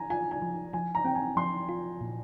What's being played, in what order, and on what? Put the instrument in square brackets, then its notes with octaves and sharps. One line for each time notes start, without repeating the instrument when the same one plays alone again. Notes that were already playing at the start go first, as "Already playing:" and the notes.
Already playing: [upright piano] G#5 A#5
[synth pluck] F4 [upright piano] G#5
[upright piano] G#5
[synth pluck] F3
[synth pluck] F3 [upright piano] G#5
[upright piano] A#5
[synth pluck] C4 [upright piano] G5
[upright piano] G#5
[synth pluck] F3 [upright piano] C6
[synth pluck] F4
A#2